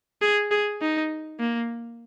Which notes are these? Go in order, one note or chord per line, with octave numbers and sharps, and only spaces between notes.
G#4
G#4
D#4
A#3